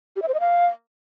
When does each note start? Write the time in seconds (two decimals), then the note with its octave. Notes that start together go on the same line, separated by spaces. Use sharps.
0.16 G4
0.22 E5
0.28 C5
0.34 D#5
0.40 F5